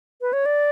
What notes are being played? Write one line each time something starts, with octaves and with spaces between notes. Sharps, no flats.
B4
C#5
D5